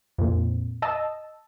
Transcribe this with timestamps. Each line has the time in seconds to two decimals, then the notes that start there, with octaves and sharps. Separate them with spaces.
0.18 F2 A#2
0.82 D#5 A5 E6